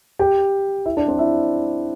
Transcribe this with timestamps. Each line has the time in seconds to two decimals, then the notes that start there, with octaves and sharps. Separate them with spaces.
0.19 G4 G5
0.85 E4 E5
0.97 D4 D5
1.08 C4 C5
1.19 E4 E5